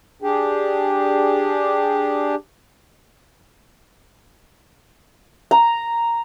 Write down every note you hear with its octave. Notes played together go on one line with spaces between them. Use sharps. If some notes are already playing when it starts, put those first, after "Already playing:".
D4 G4 G#4
A#5